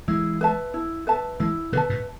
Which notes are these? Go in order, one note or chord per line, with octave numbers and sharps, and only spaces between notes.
E3 G#3 E4
B4 E5 A5
E4
B4 E5 A5
E3 G#3 E4
B2 D3 B4 E5 A5
G#2 B2